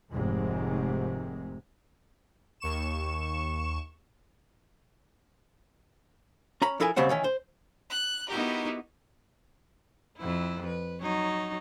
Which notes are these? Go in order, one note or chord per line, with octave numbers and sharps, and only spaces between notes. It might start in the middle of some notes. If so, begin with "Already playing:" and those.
F1 G#2 C3 D#3 G#3
D#2 C#6 E7
C#4 A#5 B5
F3 E4 A4 A#4 G#5
D#2 C#3 G3 C4 C5 F#5
D#3 E3 C#4
C5
F#6
B3 D#4 E4 F#4 G4 A#4
F2 E4
B4
F#3 D#4 C#5